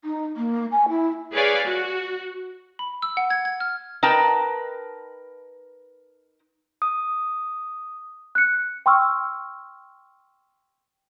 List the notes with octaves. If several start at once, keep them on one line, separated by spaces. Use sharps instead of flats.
D#4
A#3
G#5
E4
G#4 B4 C#5 D5 F5 G#5
F#4
B5
E6
F#5
G#6
G#6
F6
D#4 A#4 B4 G5 A5
D#6
F#6 C#7
G5 C6 C#6 E6 F6